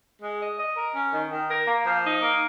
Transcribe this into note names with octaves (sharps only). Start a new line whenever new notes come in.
G#3
D#5
D#5
A#4
C#4
D#3
D#3
A#4
A#3
F3
D#4
A#3